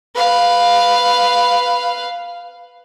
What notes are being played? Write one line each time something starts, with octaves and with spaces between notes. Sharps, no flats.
B4 F5